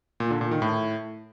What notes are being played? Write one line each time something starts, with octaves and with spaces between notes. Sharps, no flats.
A#2
D3
A#2
D#3
A2